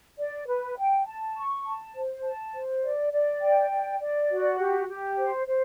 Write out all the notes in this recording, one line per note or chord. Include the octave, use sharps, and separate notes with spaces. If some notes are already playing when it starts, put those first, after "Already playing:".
D5
B4
G5
A5
C#6
A5
C5
A5
C5
D5
D5
G5
D5
D5
F#4
G4
G4
C5
C5